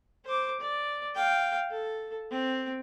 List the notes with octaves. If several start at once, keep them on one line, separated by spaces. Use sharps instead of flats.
C5 D6
D5
F5 G5
A4
C4